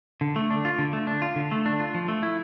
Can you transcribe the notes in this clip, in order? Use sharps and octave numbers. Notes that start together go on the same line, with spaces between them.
D3
A3
D4
F4
D3
A3
D4
F4
D3
A3
D4
F4
F3
A3
E4